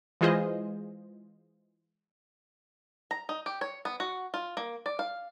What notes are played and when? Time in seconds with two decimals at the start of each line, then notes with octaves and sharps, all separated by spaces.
0.21 E3 G#3 F4 G#4 C5 D#5
3.11 A#5
3.29 D#4
3.46 G4
3.61 C#5
3.85 B3
4.00 F#4
4.34 F4
4.57 A#3
4.86 D5
4.99 F5